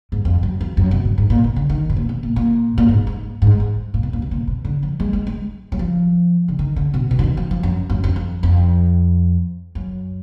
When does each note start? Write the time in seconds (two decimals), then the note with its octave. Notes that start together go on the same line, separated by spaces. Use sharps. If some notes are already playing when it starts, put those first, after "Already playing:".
0.12 G#2
0.25 F2
0.43 F#2
0.61 F2
0.77 F#2
0.91 B2
1.05 G#2
1.18 G#2
1.30 A#2
1.44 B2
1.56 D3
1.70 D#3
1.90 B2
1.97 A#2
2.09 B2
2.23 A#2
2.36 A#2
2.78 A#2
2.89 G#2
3.07 G#2
3.42 G#2
3.60 G#2
3.94 A#2
4.03 B2
4.13 A#2
4.22 B2
4.31 A#2
4.47 B2
4.65 D3
4.83 F3
5.00 G#3
5.13 G#3
5.27 G#3
5.72 F#3
5.79 F3
6.48 D3
6.59 D#3
6.76 D3
6.94 B2
7.11 B2
7.19 D3
7.24 D#3
7.37 F3
7.51 F3
7.63 F#2
7.90 F#2
8.04 F2
8.16 F2
8.43 F2
9.75 F#2